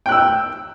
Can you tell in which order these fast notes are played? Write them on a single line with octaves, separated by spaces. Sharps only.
G5 F#6 E6